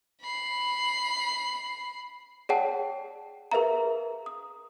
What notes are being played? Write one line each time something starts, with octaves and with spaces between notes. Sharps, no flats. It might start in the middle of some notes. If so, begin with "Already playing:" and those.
B5 C7
G#4 C#5 D5 F#5 G5 A5
G#4 A#4 B4 E5 F5 A#5
D#6